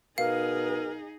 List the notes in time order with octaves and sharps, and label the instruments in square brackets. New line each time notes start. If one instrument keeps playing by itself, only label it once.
[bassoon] B2 [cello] D#4 G#4 [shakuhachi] A#4 [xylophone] F5